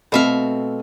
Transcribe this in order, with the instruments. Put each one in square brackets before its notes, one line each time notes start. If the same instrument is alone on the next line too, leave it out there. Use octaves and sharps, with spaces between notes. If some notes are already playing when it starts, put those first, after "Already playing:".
[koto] B2 E5 F5 [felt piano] A3 C4 A4